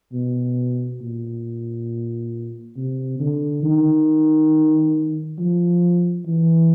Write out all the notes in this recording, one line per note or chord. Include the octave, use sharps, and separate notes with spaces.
B2
A#2
C3
D3
D#3
F3
E3